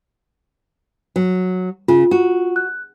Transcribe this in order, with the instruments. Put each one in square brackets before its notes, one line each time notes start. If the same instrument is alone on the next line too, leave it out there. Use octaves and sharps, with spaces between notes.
[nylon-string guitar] F#3
[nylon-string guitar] C#3 [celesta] F4
[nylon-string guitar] F#4
[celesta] F#6